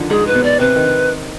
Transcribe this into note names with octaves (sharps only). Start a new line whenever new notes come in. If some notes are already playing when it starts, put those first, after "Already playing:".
Already playing: D3 D#3 F3 D4
G#2 G#3 G#4
B4
B2 B3
D5
C3 C4 B4
D#3 D#4